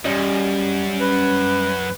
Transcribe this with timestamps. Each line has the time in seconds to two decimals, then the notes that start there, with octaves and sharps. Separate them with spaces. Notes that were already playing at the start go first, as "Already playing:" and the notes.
0.05 F#2 G3 C#4 D#5
0.99 B4